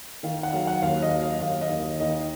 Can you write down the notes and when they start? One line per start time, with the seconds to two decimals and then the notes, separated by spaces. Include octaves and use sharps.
0.23 D#3 F5
0.43 F#5
0.53 F#3 F5
0.67 F#5
0.82 D#2 F5
1.02 D#5
1.12 F#3
1.22 F5
1.41 D#2 F5
1.61 D#5
1.70 D#2
1.80 F5
2.00 D#3 D#5